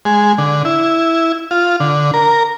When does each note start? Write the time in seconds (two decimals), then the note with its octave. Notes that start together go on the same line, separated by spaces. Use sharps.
0.05 G#3
0.38 D3
0.65 E4
1.51 F4
1.80 D3
2.14 A#4